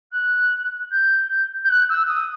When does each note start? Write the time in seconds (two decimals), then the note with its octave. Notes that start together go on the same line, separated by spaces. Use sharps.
0.12 F#6
0.91 G6
1.64 G6
1.69 F#6
1.89 E6
2.08 D#6